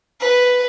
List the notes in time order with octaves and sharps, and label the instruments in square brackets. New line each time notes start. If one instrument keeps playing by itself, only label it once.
[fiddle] B4